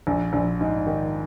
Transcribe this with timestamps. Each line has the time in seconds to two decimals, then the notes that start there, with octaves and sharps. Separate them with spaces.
0.07 A#1
0.33 A#1
0.60 G#2
0.87 D#3